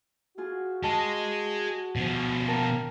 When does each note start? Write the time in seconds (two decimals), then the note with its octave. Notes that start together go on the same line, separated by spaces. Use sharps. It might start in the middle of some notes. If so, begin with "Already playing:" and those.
0.38 F4 F#4 G#4
0.84 G#4 D#5 A5
1.96 B2 F3
2.48 A#3 A#4 G5 A5